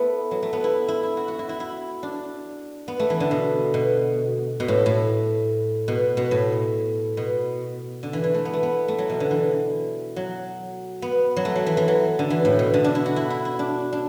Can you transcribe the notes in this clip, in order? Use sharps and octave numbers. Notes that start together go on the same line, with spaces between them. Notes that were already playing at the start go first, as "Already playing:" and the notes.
Already playing: A3 B3 E4
F#3
A3
B3
E4
E4
E4
F#4
F#4
E4
E4
E4
D4
B3
A3
E3
D3
B2
B2
B2
A2
A2
B2
B2
A2
B2
D3
E3
E3
A3
B3
A3
B3
A3
F#3
B2
D3
E3
F#3
B3
F#3
A3
F#3
E3
E3
F#3
D3
E3
A2
B2
D3
D4
E4
F#4
E4
E4
E4
D4
D4